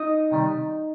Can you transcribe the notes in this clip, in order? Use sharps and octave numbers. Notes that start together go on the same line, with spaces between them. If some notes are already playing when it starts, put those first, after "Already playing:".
Already playing: D#4 D#5
C3 D#3 G3